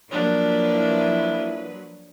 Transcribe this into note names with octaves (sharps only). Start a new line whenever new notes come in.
F3 F#3 A#3 D4 B4
E4